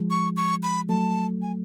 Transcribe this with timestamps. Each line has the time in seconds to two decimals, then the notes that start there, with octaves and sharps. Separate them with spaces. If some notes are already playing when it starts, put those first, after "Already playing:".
Already playing: F3 G#3
0.10 C#6
0.37 C#6
0.63 B5
0.89 F#3 A3 A5
1.42 G#5